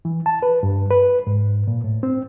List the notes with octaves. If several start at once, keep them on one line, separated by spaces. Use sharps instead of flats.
E3
A5
B4
G2
B4
G#2
A#2
A2
C4